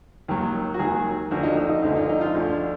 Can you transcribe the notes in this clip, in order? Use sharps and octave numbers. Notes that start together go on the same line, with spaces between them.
D#2 D#3 F#3
F#4
D#2 D#3 F#3 G#4
D2 D3 F3 F#4
D#4
D#4
D#4
D2 D3 F3 D#4
D#4
D#4
F4
D2 D3 F3